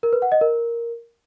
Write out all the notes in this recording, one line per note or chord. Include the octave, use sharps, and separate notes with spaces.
A#4
B4
F#5
D#5
A#4